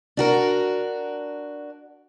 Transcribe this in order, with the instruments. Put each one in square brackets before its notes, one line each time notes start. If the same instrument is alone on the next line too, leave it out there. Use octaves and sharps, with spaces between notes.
[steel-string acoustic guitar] D4 F#4 A#4